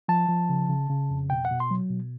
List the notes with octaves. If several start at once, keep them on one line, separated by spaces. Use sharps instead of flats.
F3 A5
F3
C#3
C#3
C#3
F2
B2 G5
F#5
B2
C6
F#3
B2